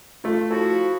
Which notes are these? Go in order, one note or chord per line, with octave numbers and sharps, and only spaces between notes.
A3 F4
F3 E4 F#4 A4